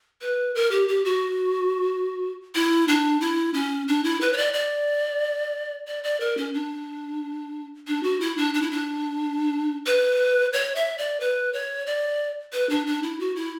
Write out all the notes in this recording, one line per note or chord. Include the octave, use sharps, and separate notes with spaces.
B4
A#4
G4
G4
F#4
E4
D4
E4
C#4
D4
E4
B4
C#5
D5
D5
D5
D5
A#4
C#4
D4
D4
F#4
E4
D4
D4
E4
D4
B4
C#5
E5
D5
B4
C#5
D5
B4
D4
D4
E4
F#4
E4